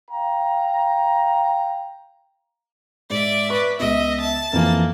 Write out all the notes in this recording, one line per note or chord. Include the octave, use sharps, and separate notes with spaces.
F5 G5 A#5
G#2 D5 E5
B4 C#6
C#2 B3 D#5 E5
A5
F2 E3 A#3